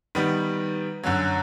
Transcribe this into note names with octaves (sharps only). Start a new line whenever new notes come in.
D#3 G3 B3
F#2 D3 F#3